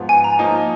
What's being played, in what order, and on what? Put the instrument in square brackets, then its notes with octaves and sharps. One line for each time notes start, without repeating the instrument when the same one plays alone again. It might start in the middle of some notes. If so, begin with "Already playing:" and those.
Already playing: [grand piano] G#2 F3 B3 F4
[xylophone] G#5
A#5
[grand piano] F3 A#3 D#4